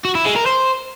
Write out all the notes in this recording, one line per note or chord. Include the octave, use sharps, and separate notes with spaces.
F#4
E4
G#3
A#4
C5